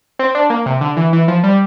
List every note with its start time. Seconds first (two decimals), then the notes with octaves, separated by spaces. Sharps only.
0.19 C4
0.35 D4
0.50 A#3
0.66 C3
0.81 D3
0.97 E3
1.13 E3
1.28 F3
1.44 G3